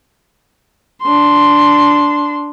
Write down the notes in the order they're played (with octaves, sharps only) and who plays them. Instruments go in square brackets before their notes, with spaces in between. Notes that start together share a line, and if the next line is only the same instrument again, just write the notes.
[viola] D4 C6